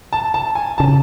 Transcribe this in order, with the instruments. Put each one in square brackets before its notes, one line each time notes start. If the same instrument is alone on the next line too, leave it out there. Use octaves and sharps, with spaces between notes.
[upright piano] A5
A5
G#5
[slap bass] C#3 [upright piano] A5